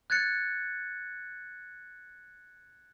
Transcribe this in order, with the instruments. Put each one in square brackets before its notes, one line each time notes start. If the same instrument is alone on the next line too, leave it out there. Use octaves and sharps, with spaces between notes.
[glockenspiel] F#6 G#6 A6 C#7